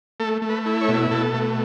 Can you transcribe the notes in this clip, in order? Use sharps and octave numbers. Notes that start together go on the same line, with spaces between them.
A3 A4
A3
B4
E4
C#5
B2
B2 A4
A3